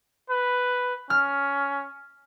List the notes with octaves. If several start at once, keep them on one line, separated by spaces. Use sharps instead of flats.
B4
C#4 F6